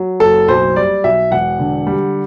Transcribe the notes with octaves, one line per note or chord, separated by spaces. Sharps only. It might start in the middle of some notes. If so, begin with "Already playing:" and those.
Already playing: F#3
F#1 A4
B1 C5
G3 D5
B1 E5
E1 F#5
D3
G3